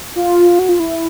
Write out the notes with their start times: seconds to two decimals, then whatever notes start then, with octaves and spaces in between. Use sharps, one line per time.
0.16 F4
0.59 F#4
0.69 F4
0.80 E4